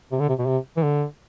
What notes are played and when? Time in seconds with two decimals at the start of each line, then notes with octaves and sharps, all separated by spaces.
0.12 C3
0.20 D3
0.29 C3
0.39 B2
0.47 C3
0.77 E3
0.83 D3